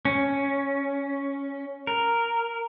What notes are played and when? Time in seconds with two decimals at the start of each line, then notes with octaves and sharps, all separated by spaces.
0.05 C#4
1.87 A#4